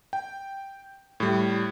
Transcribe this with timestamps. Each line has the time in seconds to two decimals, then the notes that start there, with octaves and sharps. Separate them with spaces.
0.13 G5
1.20 A2 G3